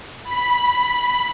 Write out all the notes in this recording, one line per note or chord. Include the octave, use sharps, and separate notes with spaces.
B5